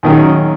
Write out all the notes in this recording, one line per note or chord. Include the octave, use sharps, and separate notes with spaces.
D#2 D#3 F#3 C#4 G#4